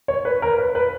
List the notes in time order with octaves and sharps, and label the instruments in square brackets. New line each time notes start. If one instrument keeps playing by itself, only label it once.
[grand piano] C#5
B4
A#4
B4
B4